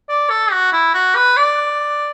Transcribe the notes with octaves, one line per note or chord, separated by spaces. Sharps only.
D5
A4
F#4
E4
F#4
B4
D5